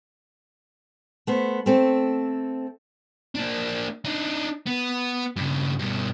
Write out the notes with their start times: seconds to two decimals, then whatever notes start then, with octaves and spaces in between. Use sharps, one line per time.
1.27 A3 B3 C5
1.66 A3 C4 A4
3.35 A#3 D4
4.05 D4 D#4
4.66 B3
5.36 G2 C#3
5.79 G2 B2